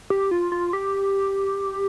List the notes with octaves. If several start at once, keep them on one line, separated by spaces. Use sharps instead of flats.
G4
F4
F4
G4